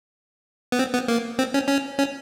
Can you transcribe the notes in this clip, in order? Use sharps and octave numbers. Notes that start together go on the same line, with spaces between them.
B3
C4
B3
A#3
C4
C#4
C#4
C#4